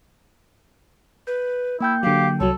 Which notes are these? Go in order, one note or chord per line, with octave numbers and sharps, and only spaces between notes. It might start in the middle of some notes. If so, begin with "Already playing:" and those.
B4 G6
A#3 E4 G5 G6
D3 F#3 G4 F5
C2 F#3 A4 C#5